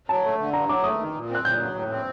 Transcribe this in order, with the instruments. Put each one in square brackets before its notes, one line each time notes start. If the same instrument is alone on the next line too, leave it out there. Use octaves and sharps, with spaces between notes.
[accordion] F#3 [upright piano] A5
[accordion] A3
D3
[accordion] G2 [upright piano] A#5
[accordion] F#3 [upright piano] D6
[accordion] A3 [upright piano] D#6
[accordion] D#3
A#2
[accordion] C4 [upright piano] F#6
[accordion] A#2 [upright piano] G6
[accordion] F#3
A2
C4